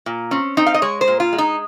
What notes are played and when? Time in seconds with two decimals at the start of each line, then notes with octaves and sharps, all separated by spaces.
0.06 A#2
0.31 C4 C#4
0.57 C4 D#4
0.66 F5
0.74 D#5
0.82 G#3 C#5
1.01 C5
1.08 A#2
1.20 F4
1.33 G#3
1.38 D#4